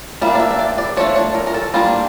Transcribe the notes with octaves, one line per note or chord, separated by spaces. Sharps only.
G3 A#3 D4 E5
D5
E5
E5
D5
D5
F3 A3 D4 C#5
C#5
A#4
A#4
A4
G3 A#3 D4 F4